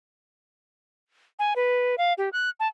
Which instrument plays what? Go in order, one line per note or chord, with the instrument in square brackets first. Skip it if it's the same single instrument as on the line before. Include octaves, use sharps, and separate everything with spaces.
[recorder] G#5
B4
F5
G4
F#6
A5